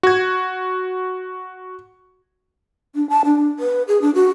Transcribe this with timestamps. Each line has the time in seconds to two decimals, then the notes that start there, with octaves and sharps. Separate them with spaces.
0.03 F#4 G#6
2.95 D4
3.09 A5
3.25 D4
3.59 B4
3.88 G#4
4.02 D4
4.15 F#4